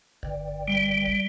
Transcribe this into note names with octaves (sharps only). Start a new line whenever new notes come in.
G1
G3